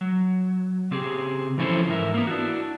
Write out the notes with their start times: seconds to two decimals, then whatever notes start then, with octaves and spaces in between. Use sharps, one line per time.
0.01 F#3
0.91 C#3 C4 G4 G#4
1.58 E3 F3 C#4 E4 A4 C5
1.89 G#2 E3 A#4 E5
2.14 A#3 B3
2.27 D4 E4 F#4